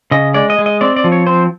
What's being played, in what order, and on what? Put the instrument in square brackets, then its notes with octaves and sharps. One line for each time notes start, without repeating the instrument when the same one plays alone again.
[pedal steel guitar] C#3 D#5
G#3 D5
D#5
G#3
D#5
C4 D5
D5
F3
C#5
C4 C5